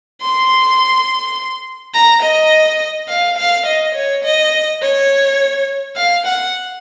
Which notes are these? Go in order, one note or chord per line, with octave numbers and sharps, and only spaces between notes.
C6
A#5
D#5
F5
F5
D#5
C#5
D#5
C#5
F5
F#5